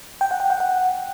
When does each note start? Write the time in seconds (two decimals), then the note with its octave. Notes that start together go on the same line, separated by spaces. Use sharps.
0.21 G5
0.31 F#5
0.40 G5
0.50 F#5
0.60 F#5